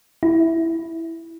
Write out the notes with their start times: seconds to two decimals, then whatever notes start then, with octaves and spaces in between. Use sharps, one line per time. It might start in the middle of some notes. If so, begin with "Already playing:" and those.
0.23 E4